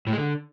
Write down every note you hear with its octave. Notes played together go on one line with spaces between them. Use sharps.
A2
G#3
D3